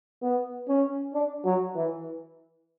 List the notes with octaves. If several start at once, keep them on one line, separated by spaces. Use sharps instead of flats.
B3
C#4
D4
F#3
E3